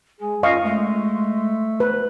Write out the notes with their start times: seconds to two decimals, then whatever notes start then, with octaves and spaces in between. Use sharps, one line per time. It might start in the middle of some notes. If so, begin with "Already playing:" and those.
0.21 G#3 G#4
0.43 F#2 F4 D#5 F5 C#6
0.64 G#3 A3
1.80 B4 C5